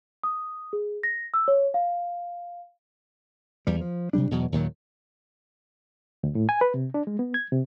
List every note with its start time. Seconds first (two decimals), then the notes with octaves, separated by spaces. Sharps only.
0.24 D#6
0.73 G#4
1.03 A#6
1.34 E6
1.48 C#5
1.74 F5
3.67 E2 G3
3.81 F3
4.13 C3 F#3 G3 D4
4.31 E2 B2 F#3
4.52 D#2 A#2 D#3 F#3
6.23 D2
6.35 A2
6.49 G#5
6.61 B4
6.74 C3
6.94 D4
7.07 G#3
7.19 B3
7.34 G#6
7.52 C3